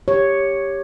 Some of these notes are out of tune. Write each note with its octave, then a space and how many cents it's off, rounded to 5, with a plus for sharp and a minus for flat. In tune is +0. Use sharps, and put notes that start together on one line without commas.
G4 +10 C#5 +0